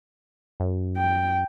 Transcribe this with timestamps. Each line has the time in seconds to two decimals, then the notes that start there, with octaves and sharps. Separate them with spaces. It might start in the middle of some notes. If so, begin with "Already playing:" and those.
0.60 F#2
0.97 G5